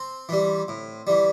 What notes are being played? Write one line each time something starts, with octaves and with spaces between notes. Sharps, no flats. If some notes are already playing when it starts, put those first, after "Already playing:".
Already playing: C4
E3 G3
A2
E3 G3